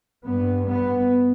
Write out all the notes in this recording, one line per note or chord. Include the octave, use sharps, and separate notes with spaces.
G2 B3
B3